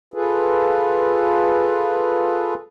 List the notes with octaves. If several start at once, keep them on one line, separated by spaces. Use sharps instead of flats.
F4 G#4 A4 B4